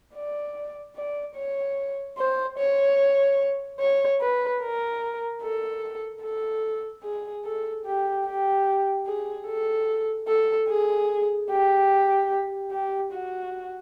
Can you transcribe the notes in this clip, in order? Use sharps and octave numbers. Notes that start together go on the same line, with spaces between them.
D5
D5
C#5
C5
C#5
C#5
B4
A#4
A4
A4
G#4
A4
G4
G4
G#4
A4
A4
G#4
G4
G4
F#4